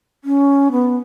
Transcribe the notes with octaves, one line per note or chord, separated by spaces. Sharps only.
C#4
B3